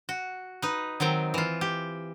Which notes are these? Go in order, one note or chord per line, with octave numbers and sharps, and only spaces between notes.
F#4
D#4 B4
D#3 F#3 C4 G5
E3 F4
G4